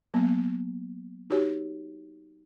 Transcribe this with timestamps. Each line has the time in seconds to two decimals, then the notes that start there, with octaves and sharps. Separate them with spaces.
0.14 F#3 A#3 B3
1.30 D#4 F#4 G4 C#5